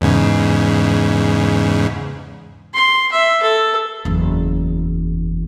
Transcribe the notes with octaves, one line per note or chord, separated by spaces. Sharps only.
E2 G#2 C#3
C6
E5
A4
F#1 E2